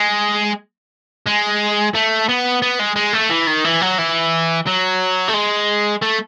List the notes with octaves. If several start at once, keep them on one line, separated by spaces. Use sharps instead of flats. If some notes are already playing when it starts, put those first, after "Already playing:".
Already playing: G#3
G#3
A3
B3
B3
G#3
G#3
A3
E3
D#3
E3
F#3
E3
F#3
A3
G#3
A3